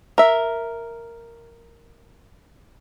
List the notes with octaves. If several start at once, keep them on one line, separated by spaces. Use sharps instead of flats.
A#4 E5